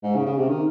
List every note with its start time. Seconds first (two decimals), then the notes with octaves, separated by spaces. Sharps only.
0.03 G#2
0.15 C#3
0.26 C#3
0.38 C3
0.49 D#3